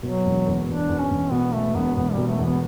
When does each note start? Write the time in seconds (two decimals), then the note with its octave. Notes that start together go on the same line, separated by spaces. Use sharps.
0.03 B2 F#3
0.25 E1
0.47 E2
0.68 E1 D4
0.89 E2
1.00 C#4
1.10 E1
1.31 B2 B3
1.53 B2 A3
1.74 E1 B3
1.96 E1 B3
2.12 G3
2.18 B2
2.28 A3
2.39 E2
2.44 B3